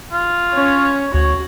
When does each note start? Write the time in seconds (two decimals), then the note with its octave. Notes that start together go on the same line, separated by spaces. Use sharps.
0.12 F4
0.51 C#4 C#5
1.14 D2 F#4 C#5